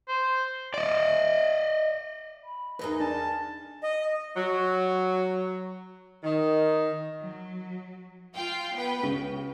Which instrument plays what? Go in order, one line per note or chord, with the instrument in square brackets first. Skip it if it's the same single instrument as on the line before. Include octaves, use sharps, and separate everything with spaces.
[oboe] C5
[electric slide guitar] D5 D#5
[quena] B5
[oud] E2 D#4 G#4 [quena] A#4 [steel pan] B4
[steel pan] D4 [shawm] A5
[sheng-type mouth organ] D#5
[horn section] F#3
D#3
[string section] F#3
F4 F5 G5
B3 B4 G5
[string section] C#2 [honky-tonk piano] C#3